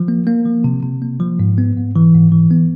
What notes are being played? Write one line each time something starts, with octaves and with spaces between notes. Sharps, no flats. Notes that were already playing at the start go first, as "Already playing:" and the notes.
Already playing: F3
A#3
A#3
F3
C3
C3
A#3
F3
G#2
B3
G#2
E3
G#2
E3
B3